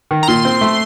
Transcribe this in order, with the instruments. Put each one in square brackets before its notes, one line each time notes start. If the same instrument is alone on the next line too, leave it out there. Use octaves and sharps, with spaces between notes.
[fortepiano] D#3
[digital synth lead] A#5
[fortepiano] A#2 [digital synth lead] C6
[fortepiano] C4
A3